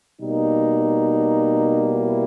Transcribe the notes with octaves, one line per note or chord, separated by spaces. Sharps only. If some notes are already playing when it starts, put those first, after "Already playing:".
B2 G3 A#3 D#4
E4